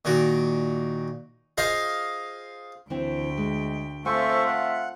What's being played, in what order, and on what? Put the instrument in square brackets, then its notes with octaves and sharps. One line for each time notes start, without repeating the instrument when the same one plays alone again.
[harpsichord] A#2 D#3 F#4
F4 G#4 C5 D#5 F5
[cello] D2 G5 [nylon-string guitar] E3 C4 E4
[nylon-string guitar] G#3
[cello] A3 C4 [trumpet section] F4 E5 [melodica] A4 C5 C#6 [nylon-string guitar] G#5
[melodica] F#5